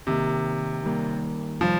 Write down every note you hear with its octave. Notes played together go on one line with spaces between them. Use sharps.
C3 D#3 A#3
D#3 G3 A#3
C3 D#3 F3 G3